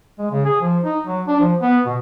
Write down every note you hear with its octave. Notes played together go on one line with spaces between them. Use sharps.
G#3
C#3
G#4
F3
D#4
F#3
D4
F3
B3
B2